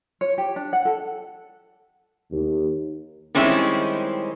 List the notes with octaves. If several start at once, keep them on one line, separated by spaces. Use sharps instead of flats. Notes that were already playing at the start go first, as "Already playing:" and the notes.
C#5
G4
D4
F#5
A4
D#2
D#3 G3 G#3 C4 C#4 E4